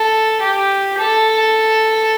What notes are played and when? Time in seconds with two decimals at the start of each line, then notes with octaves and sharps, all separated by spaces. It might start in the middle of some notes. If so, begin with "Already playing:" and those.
Already playing: A4
0.41 G4
0.98 A4